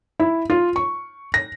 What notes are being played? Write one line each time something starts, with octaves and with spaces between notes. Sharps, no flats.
E4
F4
C#6
A#6